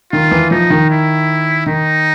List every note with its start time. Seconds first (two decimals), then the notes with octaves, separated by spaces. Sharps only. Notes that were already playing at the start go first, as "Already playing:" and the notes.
0.12 D#3 F4
0.31 E3
0.50 F3 D#4
0.70 D#3
0.90 E4
1.66 D#3 D#4